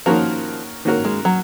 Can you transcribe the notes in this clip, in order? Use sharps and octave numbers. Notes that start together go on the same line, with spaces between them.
D#3 F3 A#3 C#4 F#4 A#4
D#3 A#3 C#4 F#4 A#4
G#3
F#3